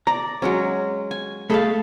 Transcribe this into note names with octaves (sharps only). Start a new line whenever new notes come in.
D5 A#5
F#3 G#3 C#4
G#5
A3 G#4 A4 F5 A5 B5